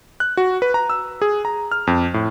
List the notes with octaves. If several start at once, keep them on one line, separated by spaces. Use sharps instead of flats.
F#6
F#4
B4
A#5
E6
G#4
A#5
F6
F2
A2